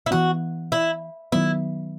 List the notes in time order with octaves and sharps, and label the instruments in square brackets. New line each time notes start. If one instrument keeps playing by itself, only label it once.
[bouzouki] E4
[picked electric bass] E3 B3 [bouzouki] F#4
[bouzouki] E4
[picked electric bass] D#3 F#3 B3 [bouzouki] E4